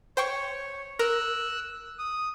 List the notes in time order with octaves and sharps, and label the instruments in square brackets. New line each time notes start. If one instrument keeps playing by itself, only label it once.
[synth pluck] C5 G5 C#6 [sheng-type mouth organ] C#5
[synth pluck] A#4 [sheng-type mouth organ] E6 F#6
[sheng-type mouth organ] D#6